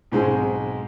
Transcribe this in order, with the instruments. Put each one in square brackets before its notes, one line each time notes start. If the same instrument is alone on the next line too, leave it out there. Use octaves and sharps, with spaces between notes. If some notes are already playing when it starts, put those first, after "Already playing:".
[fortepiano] B1 G#2 G#3 C4